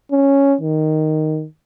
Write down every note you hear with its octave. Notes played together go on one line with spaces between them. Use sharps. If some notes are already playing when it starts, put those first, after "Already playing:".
C#4
D#3